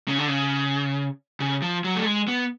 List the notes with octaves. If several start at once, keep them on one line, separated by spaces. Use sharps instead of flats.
C#3
D3
C#3
C#3
F3
F#3
A3
G#3
B3